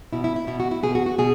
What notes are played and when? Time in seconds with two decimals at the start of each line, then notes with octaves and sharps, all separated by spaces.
0.13 B2 E4
0.24 E4
0.36 E4
0.47 B2 E4
0.60 F#4
0.71 E4
0.83 B2 G#4
0.95 F#4
1.06 F#4
1.18 B2 G#4